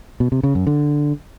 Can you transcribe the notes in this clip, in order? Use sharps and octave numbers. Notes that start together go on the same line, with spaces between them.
B2
C3
C#3
F#2
D3